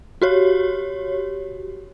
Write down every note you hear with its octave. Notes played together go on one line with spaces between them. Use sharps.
F#4 G4 C#5